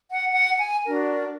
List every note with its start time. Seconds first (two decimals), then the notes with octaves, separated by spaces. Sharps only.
0.12 F#5
0.31 F#5
0.58 G#5
0.85 D4 F#4 A#4